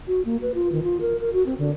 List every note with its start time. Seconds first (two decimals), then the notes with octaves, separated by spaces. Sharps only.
0.07 F#4
0.25 A#3
0.42 B4
0.55 F4
0.72 D#3
0.83 F4
1.01 A#4
1.20 A#4
1.33 F#4
1.46 C4
1.58 D3